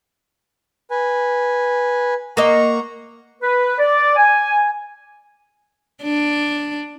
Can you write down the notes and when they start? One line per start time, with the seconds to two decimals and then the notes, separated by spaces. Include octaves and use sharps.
0.91 B4 G#5
2.37 A#3 D#5 F#5 A#5 C#6
3.42 B4
3.79 D5
4.16 G#5
6.04 D4